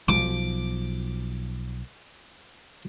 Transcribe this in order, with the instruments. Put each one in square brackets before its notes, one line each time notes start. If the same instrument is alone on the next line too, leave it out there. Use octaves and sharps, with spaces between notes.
[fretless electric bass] B1 F3 [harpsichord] D6